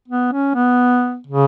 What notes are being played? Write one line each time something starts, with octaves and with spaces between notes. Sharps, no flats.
B3
C#4
B3
C#3